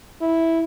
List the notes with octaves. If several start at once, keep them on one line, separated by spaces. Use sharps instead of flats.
E4